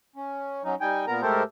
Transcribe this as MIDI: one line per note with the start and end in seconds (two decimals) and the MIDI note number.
0.16 0.63 61
0.64 0.75 54
0.64 0.75 61
0.64 0.75 63
0.81 1.05 55
0.81 1.05 63
0.81 1.05 79
0.81 1.05 80
1.07 1.21 46
1.07 1.21 59
1.07 1.21 70
1.07 1.21 82
1.22 1.43 44
1.22 1.43 57
1.22 1.43 67
1.22 1.43 69
1.22 1.43 70
1.22 1.43 72